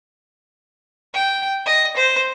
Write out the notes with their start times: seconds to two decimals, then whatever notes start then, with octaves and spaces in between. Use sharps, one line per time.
1.14 G5
1.66 D#5
1.97 C5